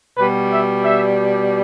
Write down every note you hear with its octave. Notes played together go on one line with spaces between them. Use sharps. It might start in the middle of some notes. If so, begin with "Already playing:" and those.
B2 G3 B4
E5
E5